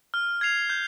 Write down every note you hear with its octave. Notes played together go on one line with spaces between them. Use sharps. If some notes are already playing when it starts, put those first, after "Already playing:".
F6
G#6 C7 F7
G6